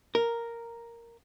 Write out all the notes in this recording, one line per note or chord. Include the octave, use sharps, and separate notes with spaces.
A#4